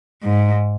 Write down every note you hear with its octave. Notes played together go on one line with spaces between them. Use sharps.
G#2